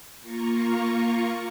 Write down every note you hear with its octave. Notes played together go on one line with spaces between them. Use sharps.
A#3 F4 A#4 C#6